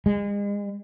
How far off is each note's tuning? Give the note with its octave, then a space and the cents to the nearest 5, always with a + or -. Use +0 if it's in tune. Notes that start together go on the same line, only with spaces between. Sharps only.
G#3 -35